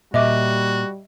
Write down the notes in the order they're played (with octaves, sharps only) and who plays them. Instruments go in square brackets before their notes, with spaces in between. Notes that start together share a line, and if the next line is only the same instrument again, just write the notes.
[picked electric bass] A#2 [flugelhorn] G3 [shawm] F#4 [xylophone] D#5 E5 D6